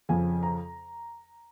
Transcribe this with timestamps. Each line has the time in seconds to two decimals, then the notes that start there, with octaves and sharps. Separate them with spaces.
0.09 F2 C#3 F3 G#5
0.43 A#5